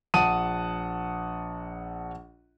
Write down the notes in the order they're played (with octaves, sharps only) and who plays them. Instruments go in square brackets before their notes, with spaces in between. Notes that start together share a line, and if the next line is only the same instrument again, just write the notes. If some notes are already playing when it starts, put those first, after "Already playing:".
[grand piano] A#1 F#5 A5 D#6 D#7